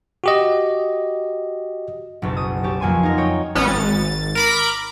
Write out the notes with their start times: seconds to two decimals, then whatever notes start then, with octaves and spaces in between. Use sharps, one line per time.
0.24 F#4 G4 D#5
2.22 F#1 B1 C#4 A5
2.37 D#6
2.63 C#4 G4 A5
2.80 F2 F#3 A#3 G#5 C6 D#7
3.03 D#4 A#4
3.18 C#5 G5 D#6
3.55 A1 B3 C#4 C#7
3.68 G#1 A6
4.35 A#4 B5 D6